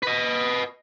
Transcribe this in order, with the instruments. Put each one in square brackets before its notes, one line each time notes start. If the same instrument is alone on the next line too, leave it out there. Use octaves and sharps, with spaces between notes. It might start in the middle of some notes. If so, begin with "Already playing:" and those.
[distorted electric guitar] B4 D#5